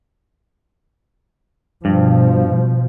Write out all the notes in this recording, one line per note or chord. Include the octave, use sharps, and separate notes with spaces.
G2 B2 F3